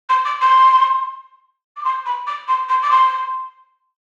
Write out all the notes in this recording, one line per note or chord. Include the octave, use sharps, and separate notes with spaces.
C6
D6
C6
D6
C6
B5
D6
C6
C6
D6
C6